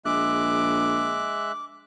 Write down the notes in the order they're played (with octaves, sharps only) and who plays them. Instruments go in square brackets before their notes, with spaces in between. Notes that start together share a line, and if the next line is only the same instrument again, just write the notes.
[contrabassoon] A#1 [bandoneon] G#3 E5 F#6 [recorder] D6